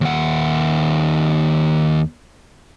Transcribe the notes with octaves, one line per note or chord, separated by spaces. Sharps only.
D#2 F#5